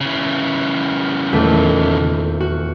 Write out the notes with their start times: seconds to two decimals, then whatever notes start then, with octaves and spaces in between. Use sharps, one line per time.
0.01 C#3 E3
1.32 D#1 E2 A3
2.40 F#4